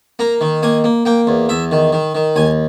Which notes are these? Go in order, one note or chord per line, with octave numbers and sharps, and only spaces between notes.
A#3 A#5
D#3
A#3 G#5
A#3
A#3 G5
E2
E2 E5
D#3
D#3
D#3
D#2 G#5